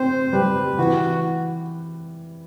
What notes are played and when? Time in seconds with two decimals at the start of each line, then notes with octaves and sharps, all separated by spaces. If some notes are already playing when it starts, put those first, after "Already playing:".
Already playing: C4 C5
0.33 G3 B4
0.78 E3 F#4